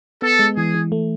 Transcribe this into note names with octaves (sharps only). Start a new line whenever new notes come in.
B3 A4
G#3
E3 G#4
E3
A3